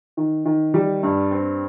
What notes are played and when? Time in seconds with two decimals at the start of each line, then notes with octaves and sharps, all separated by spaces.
0.17 D#3
0.45 D#3
0.74 G3
1.03 G2
1.31 C4